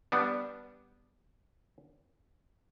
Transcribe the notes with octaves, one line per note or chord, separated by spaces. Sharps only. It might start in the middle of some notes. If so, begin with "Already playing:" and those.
G3 B3 D4